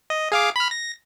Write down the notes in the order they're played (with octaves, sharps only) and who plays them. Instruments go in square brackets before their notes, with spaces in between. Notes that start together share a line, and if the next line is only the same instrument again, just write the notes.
[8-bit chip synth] D#5
G#4 F5 D6
B5 F6
A#6